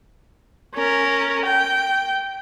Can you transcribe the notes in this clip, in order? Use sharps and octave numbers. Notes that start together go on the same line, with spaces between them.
C#4 A#4
G5